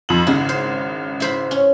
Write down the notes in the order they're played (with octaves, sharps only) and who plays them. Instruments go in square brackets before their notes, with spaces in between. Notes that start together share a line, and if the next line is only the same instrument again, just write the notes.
[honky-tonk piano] F2 F#7
[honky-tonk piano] G#1 C#3 [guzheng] E4
[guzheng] C5
E4 C5 B5
C#4